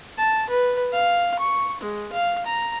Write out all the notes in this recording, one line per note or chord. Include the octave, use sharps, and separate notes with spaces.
A5
B4
F5
C#6
G#3
F5
A#5